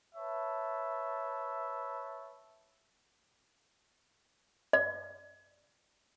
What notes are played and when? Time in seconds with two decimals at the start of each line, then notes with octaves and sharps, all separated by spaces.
0.15 B4 C#5 E5 A5
4.73 D5